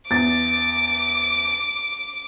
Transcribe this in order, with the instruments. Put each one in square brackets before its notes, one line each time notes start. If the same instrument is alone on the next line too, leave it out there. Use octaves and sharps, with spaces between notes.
[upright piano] E2 A6 [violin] D6